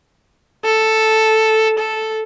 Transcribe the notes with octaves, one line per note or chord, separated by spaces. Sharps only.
A4
A4